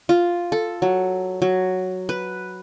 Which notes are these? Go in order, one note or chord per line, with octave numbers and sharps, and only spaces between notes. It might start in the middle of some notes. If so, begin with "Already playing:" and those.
F4
A4
F#3
F#3
B4